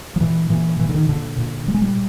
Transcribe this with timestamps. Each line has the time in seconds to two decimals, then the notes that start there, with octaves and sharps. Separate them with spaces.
0.16 F3
0.21 A#2 E3
0.50 A#2 E3
0.79 A#2 E3
0.89 D3
0.94 D#3
1.09 A#2 D3
1.38 A#2
1.67 A#2 G3
1.74 G#3
1.81 G3